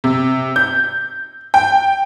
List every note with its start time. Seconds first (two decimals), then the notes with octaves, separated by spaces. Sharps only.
0.04 C3
0.56 G6
1.54 G5